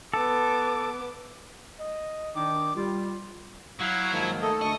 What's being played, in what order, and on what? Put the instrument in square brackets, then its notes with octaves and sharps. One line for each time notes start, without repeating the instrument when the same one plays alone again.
[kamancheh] B3 D6 [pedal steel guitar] A4
[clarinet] D#5
[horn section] D#3 D4 [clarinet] D6
[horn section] G3 [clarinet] F4
[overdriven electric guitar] F#3 [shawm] E4 [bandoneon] F5 F#5
[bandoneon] G#2 D#3 A#3 [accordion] F3
[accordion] A3 A4 [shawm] D#5
[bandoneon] D2 [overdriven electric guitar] D#5 [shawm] C#6